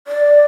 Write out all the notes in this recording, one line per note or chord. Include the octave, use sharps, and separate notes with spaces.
D5